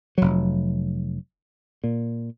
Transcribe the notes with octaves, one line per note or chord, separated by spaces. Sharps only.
F1 F#3
A#2